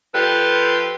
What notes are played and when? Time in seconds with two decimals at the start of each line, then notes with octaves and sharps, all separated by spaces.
0.13 F3 G4 A4 B4